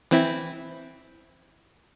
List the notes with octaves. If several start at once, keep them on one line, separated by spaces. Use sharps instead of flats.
E3 C4 E4